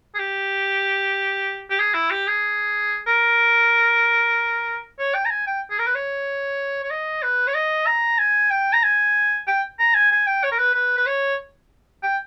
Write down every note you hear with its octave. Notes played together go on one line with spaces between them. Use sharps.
G#4
G4
G4
G#4
E4
G4
G#4
A#4
C#5
G5
A#5
G#5
G5
G#4
A#4
B4
C#5
C#5
D#5
B4
C#5
D#5
A#5
G#5
G5
A#5
G#5
G5
A#5
G#5
G#5
G5
C#5
A#4
B4
B4
B4
C#5
G5